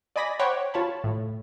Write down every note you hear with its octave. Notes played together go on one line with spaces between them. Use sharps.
D5 D#5 G#5 B5 A#6 B6
C5 C#5 F#5 G5 B5 D6
F4 C#5 A5 B5
A2